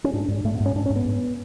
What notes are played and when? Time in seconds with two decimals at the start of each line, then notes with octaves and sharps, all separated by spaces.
0.04 C#4
0.13 G#2 D4
0.28 G#2
0.44 G#2 A3
0.55 B3
0.60 G#2
0.66 C#4
0.75 G#2 D4
0.86 C#4
0.90 G#2
0.96 B3
1.06 G#2